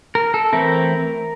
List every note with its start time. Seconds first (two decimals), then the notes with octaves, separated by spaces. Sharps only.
0.15 A#4
0.34 A4
0.53 E3 A3 C4 E4 A#4